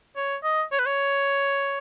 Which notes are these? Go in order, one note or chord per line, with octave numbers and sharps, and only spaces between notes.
C#5
D#5
C#5
B4
C#5